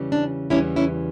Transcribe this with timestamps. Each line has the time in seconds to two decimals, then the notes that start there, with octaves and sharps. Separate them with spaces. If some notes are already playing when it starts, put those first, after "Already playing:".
Already playing: E2 C#3 E3 G3
0.12 D4
0.50 E2 C#3 E3 G3 C#4 E4
0.76 C#4 E4